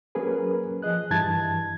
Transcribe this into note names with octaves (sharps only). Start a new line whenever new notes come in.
F#3 A#3 C#4 G#4 A#4 B4
F3 G#4 D#5 F#6
G2 E3 A5 G#6 A6